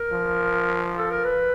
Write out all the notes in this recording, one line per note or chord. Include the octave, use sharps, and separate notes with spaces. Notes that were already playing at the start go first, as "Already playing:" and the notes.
Already playing: A#4
F3
A4
A#4
B4